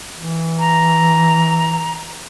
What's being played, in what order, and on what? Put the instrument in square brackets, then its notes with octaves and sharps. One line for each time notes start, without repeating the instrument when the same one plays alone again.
[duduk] E3
[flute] A#5